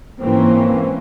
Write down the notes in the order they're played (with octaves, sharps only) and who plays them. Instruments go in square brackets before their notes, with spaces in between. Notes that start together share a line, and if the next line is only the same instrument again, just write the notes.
[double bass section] G#2 E3 A#3 C4 C#4